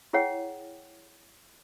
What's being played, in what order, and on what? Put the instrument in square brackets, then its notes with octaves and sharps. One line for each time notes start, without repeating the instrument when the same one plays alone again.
[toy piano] E4 G#4 C#5 F#5 G5